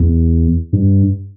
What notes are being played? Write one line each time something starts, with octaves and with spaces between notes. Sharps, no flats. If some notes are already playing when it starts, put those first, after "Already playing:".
Already playing: E2
G2